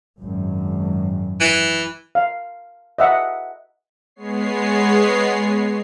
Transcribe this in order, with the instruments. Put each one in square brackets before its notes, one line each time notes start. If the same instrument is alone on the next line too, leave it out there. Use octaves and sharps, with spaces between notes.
[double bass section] G#1 F#2
[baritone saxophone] E3
[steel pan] F5
D#5 E5 F#5
[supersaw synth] G#3 B3 C#5 C7